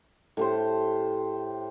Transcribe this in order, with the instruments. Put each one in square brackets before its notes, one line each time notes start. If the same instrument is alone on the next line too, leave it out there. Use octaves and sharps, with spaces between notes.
[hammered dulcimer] A2 G4 C5